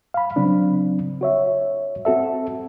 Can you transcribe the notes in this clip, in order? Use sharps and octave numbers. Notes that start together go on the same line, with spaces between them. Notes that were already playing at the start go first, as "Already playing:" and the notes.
F5 B5
C#3 F#3 C4 D4
F#4 C#5 E5
C4 F#4 A4 E5